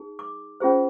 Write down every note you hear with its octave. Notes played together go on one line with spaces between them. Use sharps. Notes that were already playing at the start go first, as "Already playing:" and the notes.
Already playing: D#4 G#4
D6
C#4 F4 G#4 C5